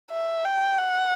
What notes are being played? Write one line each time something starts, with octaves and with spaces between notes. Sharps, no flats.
E5
G5
F#5